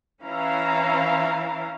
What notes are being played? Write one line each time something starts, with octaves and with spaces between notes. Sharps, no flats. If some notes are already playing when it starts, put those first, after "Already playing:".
E3 C#4 E4 F5 A#5